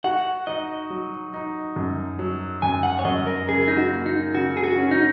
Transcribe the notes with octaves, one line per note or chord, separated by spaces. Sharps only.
F#4 F#5
D#4 D#5
F#3
D#4
F#2
F#3
F#2 G#5
F#5
C#5
F#2 D#5
A#4
C#3 G#4
D#4
F#4
A#3
D#4
C#3 F#4
G#4
F#4
C#4
D#4